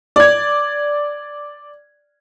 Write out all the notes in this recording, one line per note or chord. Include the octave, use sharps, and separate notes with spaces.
D5 G#6